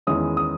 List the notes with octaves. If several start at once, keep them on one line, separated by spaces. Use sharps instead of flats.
E2 D#3 G#3 C#4 E4 D#6
D#6